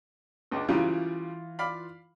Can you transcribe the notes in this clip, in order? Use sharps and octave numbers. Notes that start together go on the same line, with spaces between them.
C#2 G#3 D4
C#3 E3 F#3 G3 F4
D5 F5 B5